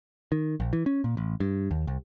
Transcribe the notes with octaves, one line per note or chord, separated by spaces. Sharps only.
D#3
A#1
E3
C#4
A#2
A1
G2
D#2
C2